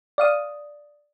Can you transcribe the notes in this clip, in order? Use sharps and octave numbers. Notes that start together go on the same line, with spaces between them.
D5 F5 D#6